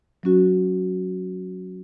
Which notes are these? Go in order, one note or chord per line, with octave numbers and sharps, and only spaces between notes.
F#3 C#4 F#4